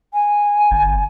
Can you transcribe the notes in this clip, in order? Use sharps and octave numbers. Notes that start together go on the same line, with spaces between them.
G#5
G1